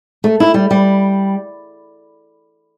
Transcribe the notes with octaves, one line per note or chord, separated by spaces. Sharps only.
A3
E4
G3
G3